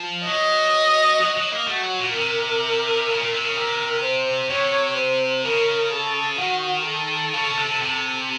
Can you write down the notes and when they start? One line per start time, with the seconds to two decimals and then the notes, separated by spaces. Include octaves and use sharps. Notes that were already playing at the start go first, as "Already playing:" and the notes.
Already playing: F3
0.26 F#3 D#5
1.21 F#3
1.37 F#3
1.52 A#3
1.67 A3 F#4
1.83 F#3
1.99 A#2
2.15 C3 A#4
3.09 C#3
3.21 A#2
3.33 C3
3.44 C#3
3.56 C3 A#4
4.03 C5
4.50 C3 C#5
4.98 C5
5.45 C#3 A#4
5.92 A4
6.39 D#3 F#4
6.87 A4
7.33 C#3
7.57 C3
7.81 C3